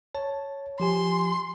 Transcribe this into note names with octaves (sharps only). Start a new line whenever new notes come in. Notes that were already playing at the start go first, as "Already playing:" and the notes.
C#5 A5
F3 G4 G#5 C6